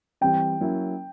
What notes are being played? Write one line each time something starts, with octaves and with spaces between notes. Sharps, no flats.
E3 G3 C4 G5
F#3 A#3 C#4 E4